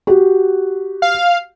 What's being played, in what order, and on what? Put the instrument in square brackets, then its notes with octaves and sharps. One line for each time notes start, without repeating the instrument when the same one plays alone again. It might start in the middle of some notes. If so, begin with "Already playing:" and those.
[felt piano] F#4 G4
[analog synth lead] F5